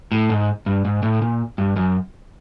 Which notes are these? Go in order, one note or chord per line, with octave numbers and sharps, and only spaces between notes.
A2
G#2
G2
G#2
A2
A#2
G2
F#2